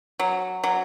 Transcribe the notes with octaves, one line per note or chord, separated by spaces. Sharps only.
F#3
F#3